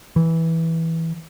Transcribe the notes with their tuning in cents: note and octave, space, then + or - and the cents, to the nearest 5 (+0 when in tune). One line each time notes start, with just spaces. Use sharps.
E3 -10